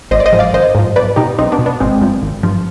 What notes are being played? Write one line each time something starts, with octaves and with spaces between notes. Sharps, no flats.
G#1 C5 D#5
D5
C5 D#5
G#2 F3
D5 F5
G#1 C5 D#5
G#2 F3
B1 B4 D5
B2 D#4 G4
B1 C4 D#4
B3 D4
B2
B3 D4
G#1 G#3 C4
G2 F3
G#1
G2 F3